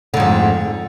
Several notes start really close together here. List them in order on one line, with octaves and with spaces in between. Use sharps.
D3 G#2 F2